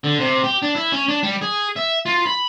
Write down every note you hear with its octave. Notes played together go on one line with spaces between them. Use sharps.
D3
C3
G4
D4
E4
C#4
D4
G3
G#4
E5
F4
B5